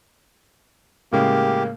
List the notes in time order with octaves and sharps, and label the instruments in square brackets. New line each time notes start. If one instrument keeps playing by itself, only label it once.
[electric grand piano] A2 C#3 G#3 [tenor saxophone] A#3 [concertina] G4